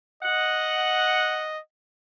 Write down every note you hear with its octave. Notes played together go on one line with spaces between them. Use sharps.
D#5 F#5